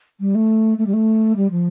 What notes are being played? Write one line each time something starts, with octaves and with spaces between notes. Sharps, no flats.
G3
A3
A3
G3
A3
G3
F3